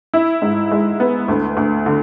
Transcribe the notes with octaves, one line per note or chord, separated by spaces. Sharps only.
E4
G#2
G#3
B3
D2
D2
D3